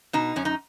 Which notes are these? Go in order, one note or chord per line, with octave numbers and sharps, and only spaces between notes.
B2 D#4
F#2 C#4
D#4